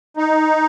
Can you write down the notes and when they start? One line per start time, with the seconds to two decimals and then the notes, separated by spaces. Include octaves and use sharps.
0.17 D#4